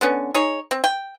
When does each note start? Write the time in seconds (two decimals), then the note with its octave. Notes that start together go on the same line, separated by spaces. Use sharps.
0.01 D3 B3 C#4
0.34 D#4 G#4 C#5
0.71 C4
0.84 G5